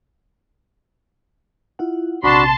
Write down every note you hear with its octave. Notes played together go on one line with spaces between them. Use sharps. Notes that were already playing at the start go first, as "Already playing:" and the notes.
E4 F4 F#5
A#1 C3 D4 F#4 A5 B5 C6